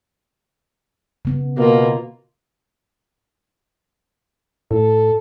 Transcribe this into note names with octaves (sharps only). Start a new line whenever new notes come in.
C#3 B3
B2 A#3 F4
A2 A4